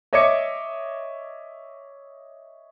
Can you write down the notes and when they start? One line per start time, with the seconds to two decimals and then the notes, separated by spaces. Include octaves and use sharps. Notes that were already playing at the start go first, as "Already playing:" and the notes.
0.13 C#5 D#5 E5 D6 G#6 C#7